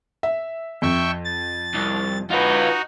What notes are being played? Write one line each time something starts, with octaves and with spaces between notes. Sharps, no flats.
E5
F2 E5 G5 C#6
A6
C2
D#4 F4 F#4 B4